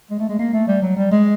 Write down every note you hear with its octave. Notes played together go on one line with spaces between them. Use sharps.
G#3
A3
G#3
A#3
A3
G3
F#3
G3
G#3